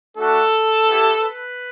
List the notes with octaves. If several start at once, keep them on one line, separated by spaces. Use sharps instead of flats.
A3 D4 F#4 A4
B3 E4 G4
B4